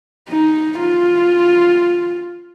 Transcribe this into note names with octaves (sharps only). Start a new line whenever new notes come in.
D#4
F4